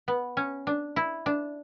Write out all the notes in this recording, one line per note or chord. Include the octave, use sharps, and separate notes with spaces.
B3
C#4
D4
E4
D4